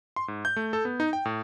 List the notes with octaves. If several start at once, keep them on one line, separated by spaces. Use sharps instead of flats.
C6
G#2
G6
A3
A4
B3
D#4
G5
A2